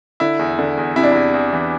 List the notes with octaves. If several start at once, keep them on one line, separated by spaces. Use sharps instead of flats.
D3 E4
E2
D3
E2
C3 E4
D4
E2 E4
E2
E3